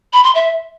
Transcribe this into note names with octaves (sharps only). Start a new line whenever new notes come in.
B5
C6
E5